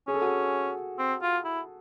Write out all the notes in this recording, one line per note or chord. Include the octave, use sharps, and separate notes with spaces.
C#4 G#4
A4
F#4 G#4
C4
F4
E4